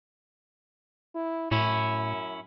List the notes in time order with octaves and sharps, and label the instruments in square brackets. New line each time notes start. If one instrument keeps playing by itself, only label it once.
[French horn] E4
[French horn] F#2 [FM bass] A2 [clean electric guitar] C#4 E4